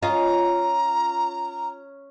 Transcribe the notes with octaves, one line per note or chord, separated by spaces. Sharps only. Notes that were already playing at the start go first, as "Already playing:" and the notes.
C#4 F4 D#5 A#5